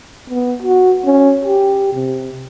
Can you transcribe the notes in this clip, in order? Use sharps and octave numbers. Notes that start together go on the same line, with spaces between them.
B3
F#4
C#4
G4
C3